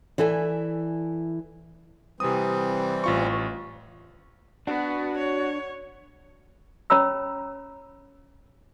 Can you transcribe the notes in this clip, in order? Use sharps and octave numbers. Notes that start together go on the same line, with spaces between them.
E3 E4 A4 D5 G#5
C3 E3 G3 C4 D#6
A1 F4 C#6
B3 D4 F#4
C#5
C#4 C#5 A#5 B5 E6